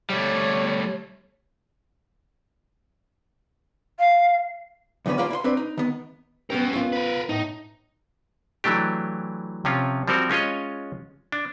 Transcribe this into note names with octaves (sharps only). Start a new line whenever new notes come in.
G3 A3 C#5
F5
B1 E2 D3 B3 C#4
A#3 F4 B4 D5 F5
E4 C6
C4 D4 B4
D#4
D#3 B3
B3 C#4 G4 A#4
B3 F4
A#4 B4
A2 D#4
E3 F#3 A3 D4 G4
C3 F3 C#4 F4
F3 G3 C4 F#4 A#4
G#3 C#4 F4 C#5 D#5
D4